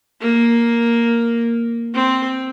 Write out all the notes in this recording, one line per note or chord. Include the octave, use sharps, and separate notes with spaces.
A#3
C4